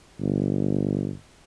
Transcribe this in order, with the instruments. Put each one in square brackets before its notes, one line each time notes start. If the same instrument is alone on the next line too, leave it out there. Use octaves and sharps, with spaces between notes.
[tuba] G1